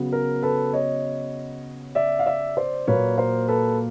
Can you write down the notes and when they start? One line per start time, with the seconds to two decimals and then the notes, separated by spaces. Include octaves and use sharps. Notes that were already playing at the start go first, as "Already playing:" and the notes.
Already playing: C#3 F#3 B3
0.13 A#4
0.43 A4 B4
0.73 C#5 D#5
1.95 D5 E5
2.19 F5
2.26 D5 E5
2.57 C5 D5
2.87 A#2 F#3 A#3 B4 C#5
3.18 A#4 C5
3.48 A4 B4